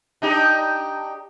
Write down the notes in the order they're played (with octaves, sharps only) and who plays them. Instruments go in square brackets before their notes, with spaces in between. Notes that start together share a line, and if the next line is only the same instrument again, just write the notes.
[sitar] D4 D#4 G4